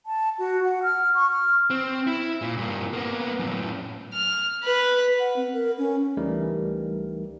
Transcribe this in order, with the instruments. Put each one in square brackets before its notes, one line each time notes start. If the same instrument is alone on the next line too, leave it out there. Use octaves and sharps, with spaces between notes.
[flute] A5
F#4
F#5
F6
C#6
F6
[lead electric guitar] C4
E4
A#2
G2 A#3
A#3 B3
F#2 A2
[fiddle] F6
B4
[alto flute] F#5
C4
A#4
C#4
[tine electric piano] C#2 E3 G3 A3 D#4 A#4